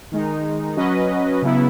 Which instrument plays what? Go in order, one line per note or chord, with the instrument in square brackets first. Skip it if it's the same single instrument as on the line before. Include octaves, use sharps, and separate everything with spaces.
[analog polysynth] D#3 G#3 D#4
F#3 C#4 F#4 B4 D#5
C#3 F#3 B3 E4